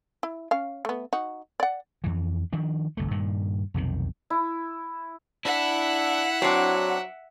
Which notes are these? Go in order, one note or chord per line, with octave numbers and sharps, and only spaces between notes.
E4
C#4 F5
A3 B3
D#4 F#4
D5 F#5
F2 E3
D#3 F3 D4
G1 C2 A3
G2 A#2 D#3
B1 F2 C3 D#3
E4
D4 E4 E5 F#5
F#3 C4 D4